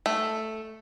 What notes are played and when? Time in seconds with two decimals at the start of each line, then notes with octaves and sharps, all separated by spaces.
0.06 A3